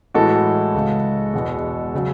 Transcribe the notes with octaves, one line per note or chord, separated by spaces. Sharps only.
A2 E3 G#3 F#4 A4
C#2 C#3 G#3
E2 B2 G#3
C#3 F#3